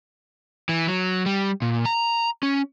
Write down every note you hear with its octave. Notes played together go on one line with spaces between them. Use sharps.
E3
F#3
G3
A#2
A#5
C#4